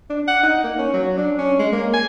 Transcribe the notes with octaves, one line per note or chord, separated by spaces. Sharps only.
D4
F#5
D#4
A#3
C#4
F#3
D4
C#4
G#3
A#3
G#5